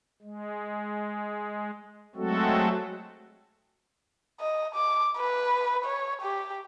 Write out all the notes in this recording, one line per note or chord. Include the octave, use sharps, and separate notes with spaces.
G#3
F#3 G#3 A3 C4 F#4 A4
D#5
D6
B4
C#5
G4